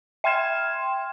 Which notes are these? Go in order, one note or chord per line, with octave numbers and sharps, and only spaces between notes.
E5 G5 C6 F6 G#6 E7